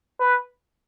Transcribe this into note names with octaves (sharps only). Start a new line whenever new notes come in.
B4